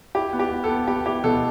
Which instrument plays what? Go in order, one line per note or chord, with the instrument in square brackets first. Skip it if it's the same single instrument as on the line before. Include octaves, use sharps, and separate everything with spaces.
[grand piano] E4 G4
B3
G4
B3
A4
B3
B3 G4
E4 G4
B2 A4